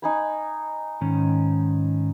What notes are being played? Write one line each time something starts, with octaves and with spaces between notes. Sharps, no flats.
D#4 G#5 B5
G#2 D#3 C#4